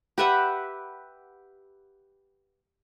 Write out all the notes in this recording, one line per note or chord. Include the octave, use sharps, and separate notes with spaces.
G4 B4 E5 F#5